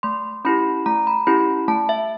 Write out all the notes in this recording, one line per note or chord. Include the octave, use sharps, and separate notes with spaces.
A3 C6
C#4 E4 G4 B5
A3 A#5
B5
C#4 E4 G4 B5
A3 A5
E5